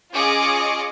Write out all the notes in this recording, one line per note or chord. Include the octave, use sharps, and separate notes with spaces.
C#4 F4 G#4 D#5 C#6 D6